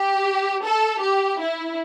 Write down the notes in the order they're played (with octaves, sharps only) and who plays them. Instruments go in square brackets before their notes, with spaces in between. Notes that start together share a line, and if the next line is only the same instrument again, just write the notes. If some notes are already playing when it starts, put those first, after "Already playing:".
Already playing: [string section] G4
A4
G4
E4